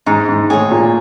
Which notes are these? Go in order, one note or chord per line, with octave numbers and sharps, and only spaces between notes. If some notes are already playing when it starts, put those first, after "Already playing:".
G#2 D#4
G#2
A2 G#4 C#5
A#2